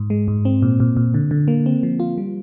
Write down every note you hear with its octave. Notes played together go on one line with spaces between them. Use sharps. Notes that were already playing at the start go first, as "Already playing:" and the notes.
Already playing: G#2
G#3
G#2
C4
A#2
A#2
A#2
D3
D3
A#3
C4
F3
F4
G3